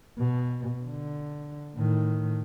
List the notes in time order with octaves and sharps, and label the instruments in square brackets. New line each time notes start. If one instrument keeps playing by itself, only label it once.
[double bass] B2
D3
A2 D#3